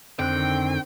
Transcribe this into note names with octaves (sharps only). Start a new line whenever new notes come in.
F2 D3 D#3 C4 G5 F#6